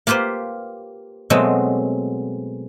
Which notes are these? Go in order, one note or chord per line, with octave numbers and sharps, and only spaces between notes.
A#3 F4 G4 B4 C5
B2 F#3 G#3 A3 C4